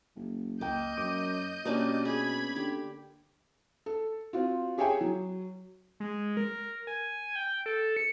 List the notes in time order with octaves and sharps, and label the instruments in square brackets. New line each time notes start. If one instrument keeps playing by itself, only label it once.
[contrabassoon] F#1
[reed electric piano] C#2 G5 [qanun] A#3 [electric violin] D#5 G6
[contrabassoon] F#2 [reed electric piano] D6
[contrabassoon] B2 [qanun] A#3 D4 G4 [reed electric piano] B3 C#4
[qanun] G#4 [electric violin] B5 G#6
[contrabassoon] D3 [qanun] G4
[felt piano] A4
C4 F4 F#4
G4 G#4 C#5 E5 G5 G#5
F#3
[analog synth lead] G#3
A#4
G#5
G5
A4
C#7